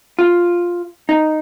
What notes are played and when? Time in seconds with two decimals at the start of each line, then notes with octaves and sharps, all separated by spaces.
0.19 F4
1.09 D#4